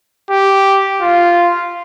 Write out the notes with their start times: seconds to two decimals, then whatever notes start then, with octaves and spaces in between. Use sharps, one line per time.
0.30 G4
1.01 F4